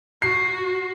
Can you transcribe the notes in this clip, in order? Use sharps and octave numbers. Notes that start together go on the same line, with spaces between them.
F#4 C7